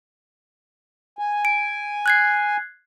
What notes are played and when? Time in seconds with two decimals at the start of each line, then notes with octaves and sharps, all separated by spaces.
1.19 G#5
1.45 D7
2.06 F#6 G#6 C7